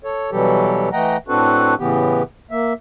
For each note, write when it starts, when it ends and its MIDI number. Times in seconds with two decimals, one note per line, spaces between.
0.04 0.30 69
0.04 0.30 73
0.32 0.89 47
0.32 0.89 52
0.32 0.89 54
0.32 0.89 55
0.32 0.89 67
0.32 0.89 69
0.93 1.17 52
0.93 1.17 57
0.93 1.17 75
0.93 1.17 78
0.93 1.17 79
0.93 1.17 82
1.28 1.74 45
1.28 1.74 60
1.28 1.74 62
1.28 1.74 66
1.28 1.74 69
1.28 1.74 71
1.79 2.23 45
1.79 2.23 49
1.79 2.23 52
1.79 2.23 59
1.79 2.23 67
2.51 2.73 58
2.51 2.73 76